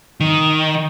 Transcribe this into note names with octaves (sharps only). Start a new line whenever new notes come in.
D#3